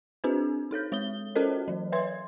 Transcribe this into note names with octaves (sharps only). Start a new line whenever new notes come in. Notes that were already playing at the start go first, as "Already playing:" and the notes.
C4 D4 F#4 G#4 B4 C5
D#4 A4 C#5 G6
G#3 C#5 D#6 G7
C#4 F#4 A4 A#4 C5 D#5
E3 F#3
B4 C#5 E5 C6 G#6